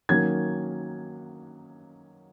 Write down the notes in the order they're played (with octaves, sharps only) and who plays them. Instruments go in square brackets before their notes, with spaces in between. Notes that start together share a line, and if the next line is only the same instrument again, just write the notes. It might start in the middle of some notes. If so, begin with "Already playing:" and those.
[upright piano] D#3 F#3 A#3 C#4 G#6